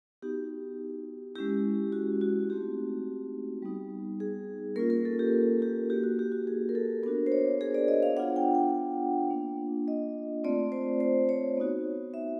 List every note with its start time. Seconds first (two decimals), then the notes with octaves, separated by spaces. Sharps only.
0.22 B3 D#4 F#4 G4
1.36 G#3 C#4 E4 G4
1.92 F#4
2.21 F#4
2.49 A3 C4 D#4 F#4 G4
3.62 G3 B3 D#4
4.20 G#4
4.76 A#3 C#4 F4 A#4
4.90 A#4
5.05 A4
5.19 G4
5.62 G4
5.90 A#3 D#4 F#4 G4
6.04 F#4
6.19 G4
6.32 F#4
6.47 G#4
6.69 A#4
6.75 A4
7.03 B3 D4 F#4 A#4
7.26 C5
7.32 C#5
7.61 G#4
7.74 D5
7.88 D#5
8.03 F5
8.16 B3 D4 F4 F#5
8.36 G5
8.55 G5
9.30 A#3 D4 F4
9.88 D#5
10.44 A3 C4 F4 D5
10.72 C5
11.00 C5
11.29 C#5
11.57 B3 D#4 F#4
12.14 E5